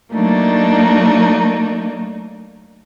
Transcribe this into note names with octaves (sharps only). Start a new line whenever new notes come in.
F#3 A3 A#3 D4 D#4